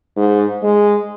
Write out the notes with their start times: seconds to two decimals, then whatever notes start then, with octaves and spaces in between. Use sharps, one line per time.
0.17 G#2
0.62 G#3